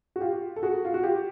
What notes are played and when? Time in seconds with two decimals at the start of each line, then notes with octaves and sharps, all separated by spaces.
0.16 F#4
0.20 F4 G4
0.56 A4
0.63 F#4 G#4
0.85 F4
0.94 F#4
1.03 F4 G4